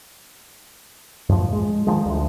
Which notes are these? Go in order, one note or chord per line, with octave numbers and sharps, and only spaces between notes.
F#2 A2 F3
G#3
D#3 F3 G#3
D2